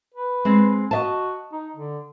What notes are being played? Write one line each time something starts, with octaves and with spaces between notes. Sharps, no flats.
B4
G#3 C4
F#4 D#5 E5 A5
D#4
D3